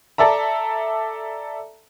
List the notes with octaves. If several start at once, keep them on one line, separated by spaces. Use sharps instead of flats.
A4 D5 E5 A#5